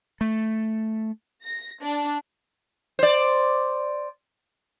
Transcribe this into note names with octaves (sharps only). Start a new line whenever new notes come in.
A3
A#6
D4
C5 D5